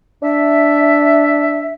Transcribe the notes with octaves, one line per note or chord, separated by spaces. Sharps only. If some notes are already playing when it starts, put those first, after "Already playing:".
D4 E5